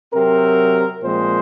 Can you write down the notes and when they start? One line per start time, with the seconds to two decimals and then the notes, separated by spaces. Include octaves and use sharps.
0.13 C3 F#3 C4 A#4
1.03 A#2 F3 G#3 C4 C5